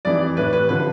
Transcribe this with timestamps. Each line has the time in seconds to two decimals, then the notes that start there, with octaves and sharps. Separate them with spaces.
0.05 F2 E3 G3 D5
0.37 A2 E3 G3 B4
0.53 B4
0.69 D3 F3 B4